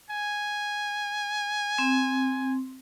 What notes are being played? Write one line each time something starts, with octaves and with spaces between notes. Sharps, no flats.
G#5
C4